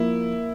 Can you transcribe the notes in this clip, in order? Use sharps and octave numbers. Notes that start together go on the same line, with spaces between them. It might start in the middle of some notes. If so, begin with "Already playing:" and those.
Already playing: F3 A#3 E4